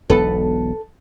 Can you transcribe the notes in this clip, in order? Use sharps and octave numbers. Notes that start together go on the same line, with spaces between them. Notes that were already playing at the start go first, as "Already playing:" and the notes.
E1 B1 B3 A4 B4